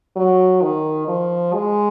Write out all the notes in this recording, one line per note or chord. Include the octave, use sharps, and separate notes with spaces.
F#3
D#3
F3
G#3